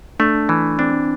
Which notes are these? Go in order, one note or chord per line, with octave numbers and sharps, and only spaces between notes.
A3 D4
E3
C4 D4